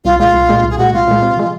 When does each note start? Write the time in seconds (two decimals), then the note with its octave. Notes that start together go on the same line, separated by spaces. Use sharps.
0.05 C2 F4
0.19 A#2 G#3 F4
0.34 C2
0.49 A#2 G#3
0.63 C2
0.70 G#4
0.78 A#2 G#3 F#4
0.93 C2 F4
1.08 A#2 G#3
1.22 C3
1.37 F3 G#3